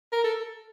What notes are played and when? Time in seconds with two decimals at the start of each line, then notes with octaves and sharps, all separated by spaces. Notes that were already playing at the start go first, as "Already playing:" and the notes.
0.12 A#4
0.24 A4